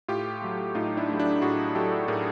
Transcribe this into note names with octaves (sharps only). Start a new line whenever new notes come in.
A2 F4 G4
F#3 A3
A2 D#4 F4
D4 E4
F#3 A3
D4 E4
A2 F#4 G#4
F#3 A3 G4 A4
A2 G#4 A#4